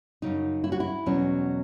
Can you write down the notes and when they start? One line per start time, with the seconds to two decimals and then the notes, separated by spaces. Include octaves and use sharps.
0.22 F#2 C#3 F#3 D#4
0.64 E4
0.72 F#4
0.80 E4
1.06 E2 B2 F#3 C#4